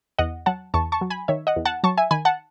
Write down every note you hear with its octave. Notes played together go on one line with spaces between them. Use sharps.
E2 D#5 F#5
F#3 F#5 A5
E2 A5 C#6
A5 C#6
F#3
G#5 B5
D#3 C#5 E5
D#5 F#5
E2
F#5 A5
F#3 A5 C#6
E5 G#5
D#3 G#5 B5
F#5 A5